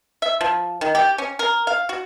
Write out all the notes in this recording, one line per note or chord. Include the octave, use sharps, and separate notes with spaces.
E5
F3
D#3
G4
C#4
A#4
F5
F#4